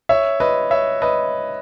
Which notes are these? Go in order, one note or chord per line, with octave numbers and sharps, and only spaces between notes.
C#5 E5
B4 D#5
C#5 E5
B4 D#5